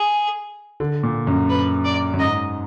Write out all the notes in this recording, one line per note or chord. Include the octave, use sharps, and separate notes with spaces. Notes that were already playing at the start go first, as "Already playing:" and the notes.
Already playing: G#4
D3
A#2
F#2
B4
D5
F#2
G#2 D#5